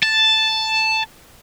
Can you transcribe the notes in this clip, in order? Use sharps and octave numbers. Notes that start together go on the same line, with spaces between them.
A5